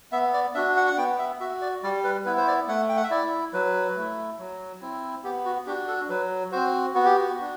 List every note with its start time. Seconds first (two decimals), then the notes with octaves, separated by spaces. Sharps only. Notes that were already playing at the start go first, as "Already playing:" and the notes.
0.12 B3 E5
0.34 D5
0.55 D4 F#4 E5
0.77 F#5
0.87 F#5
0.98 B3 G5
1.19 E5
1.40 F#4 E5
1.62 D5
1.83 G3 D5
2.04 B4
2.26 B3 E4 B4
2.37 C5
2.47 D5
2.68 A3 F#5
2.89 G5
2.97 F#5
3.03 E5
3.11 E4 D5
3.53 F#3 B4
3.96 A3 E4
4.39 F#3
4.81 C4 E4
5.24 B3 G4
5.45 F#4
5.67 D4 F#4 G4
5.88 A4
6.09 F#3 B4
6.52 C4 F#4 C5
6.95 B3 F#4
7.06 G4
7.17 F#4
7.37 D4 F#4